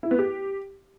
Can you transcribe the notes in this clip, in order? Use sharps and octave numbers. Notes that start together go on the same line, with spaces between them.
E4
B3
G4